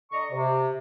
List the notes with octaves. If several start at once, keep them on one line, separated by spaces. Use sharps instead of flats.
D3 D5 D#5 A#5 C#6
C3